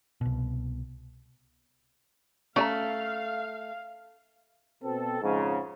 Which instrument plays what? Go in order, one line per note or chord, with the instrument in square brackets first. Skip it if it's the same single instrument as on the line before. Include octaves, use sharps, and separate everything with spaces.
[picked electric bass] C2 B2
[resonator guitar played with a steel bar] A3 [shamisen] C#4 D#5 A#5 [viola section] F5
[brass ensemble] B2 C4 A4
F2 G#2 C#3